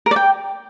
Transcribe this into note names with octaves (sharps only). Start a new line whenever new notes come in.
A#4
D5
G5